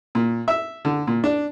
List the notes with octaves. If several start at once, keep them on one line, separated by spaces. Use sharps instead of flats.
A#2
E5
D3
A#2
D4